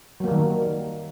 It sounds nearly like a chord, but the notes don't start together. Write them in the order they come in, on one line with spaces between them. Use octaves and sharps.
F#3 A#3 G3 D#3